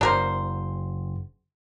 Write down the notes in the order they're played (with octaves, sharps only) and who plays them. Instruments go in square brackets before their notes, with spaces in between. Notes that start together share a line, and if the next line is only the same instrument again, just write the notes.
[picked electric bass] F#1 [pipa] D4 A#4 C5